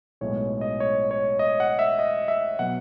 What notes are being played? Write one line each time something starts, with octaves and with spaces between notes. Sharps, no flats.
B1 A2 G#3 B3 C#5
D#5
C#5
C#5
D#5
F#5
E5
D#5
E5
B2 F#3 B3 F#5